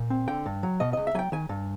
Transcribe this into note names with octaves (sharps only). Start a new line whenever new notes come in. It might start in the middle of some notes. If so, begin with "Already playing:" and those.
Already playing: A#2
C4
D3 G5
G2
F#3
B2 D#5
C#2 D#5
E5
F#3 G5 G#5
D#3 G#5
G2